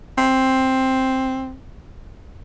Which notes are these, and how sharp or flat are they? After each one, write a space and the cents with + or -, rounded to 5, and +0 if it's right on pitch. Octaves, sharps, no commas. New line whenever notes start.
C4 +5